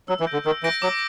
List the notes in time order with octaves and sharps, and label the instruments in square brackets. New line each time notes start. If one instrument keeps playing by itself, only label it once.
[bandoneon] F#3 [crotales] E6
[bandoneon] E3
[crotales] G6 A#6 D7
[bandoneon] D3
[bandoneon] D#3 [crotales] E6
[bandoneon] E3 [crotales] G6 A#6 D7
[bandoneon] F#3 [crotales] D6